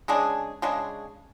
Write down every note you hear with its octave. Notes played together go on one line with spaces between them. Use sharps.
C#3 G#3 D4 G#4
C#3 G#3 D4 G#4